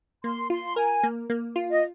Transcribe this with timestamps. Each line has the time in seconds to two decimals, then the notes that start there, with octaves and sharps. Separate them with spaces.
0.24 A#3 C6
0.50 F4 C6
0.76 A#4 G#5
1.03 A#3
1.30 A#3
1.56 F4
1.70 D#5